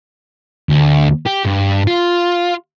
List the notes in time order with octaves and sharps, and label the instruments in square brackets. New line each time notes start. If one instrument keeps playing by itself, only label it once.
[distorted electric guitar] D2
G4
G2
F4